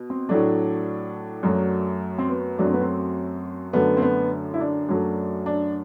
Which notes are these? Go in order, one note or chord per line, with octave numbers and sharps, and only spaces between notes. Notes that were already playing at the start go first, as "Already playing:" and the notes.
Already playing: B2
C4
A2 F#3 A3 D4
F#2 F#3 A3
C4
B3
F#2 F#3 A3 D4
C4
B3
C4
F#2 D3 A3 B3
C4
B3
E4
D4
F#2 F#3 A3
D4